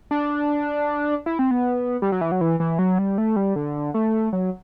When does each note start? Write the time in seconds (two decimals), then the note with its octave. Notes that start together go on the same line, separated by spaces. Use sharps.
0.11 D4
1.26 E4
1.39 C4
1.51 B3
2.02 G3
2.12 F#3
2.21 E3
2.32 F#3
2.41 E3
2.60 E3
2.79 F#3
2.98 G3
3.18 A3
3.36 G3
3.56 D3
3.94 A3
4.33 F#3